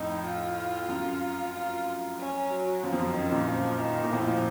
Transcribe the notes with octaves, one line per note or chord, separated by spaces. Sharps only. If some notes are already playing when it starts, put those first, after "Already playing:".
Already playing: F2 A2 D#4
F4
F#2
F4
C#4
F#3
F#2 F3
F2
F#2
D#3
F#2 A#2
F3
D#3
A#2
F2 A2 F3